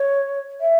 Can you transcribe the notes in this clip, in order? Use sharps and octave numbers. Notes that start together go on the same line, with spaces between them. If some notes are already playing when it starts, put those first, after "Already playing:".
Already playing: C#5
E5